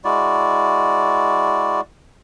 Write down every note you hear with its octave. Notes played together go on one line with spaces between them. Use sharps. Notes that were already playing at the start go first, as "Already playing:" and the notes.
G#3 E4 F#4 D5